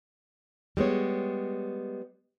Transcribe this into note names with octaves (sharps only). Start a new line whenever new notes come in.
G3 G#3 B3 C#5